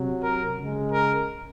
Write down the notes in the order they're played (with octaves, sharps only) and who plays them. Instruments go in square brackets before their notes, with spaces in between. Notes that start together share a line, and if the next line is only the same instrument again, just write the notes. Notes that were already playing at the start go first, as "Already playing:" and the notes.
Already playing: [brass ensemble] C3 F#3
A#4
C#3 G#3
A#4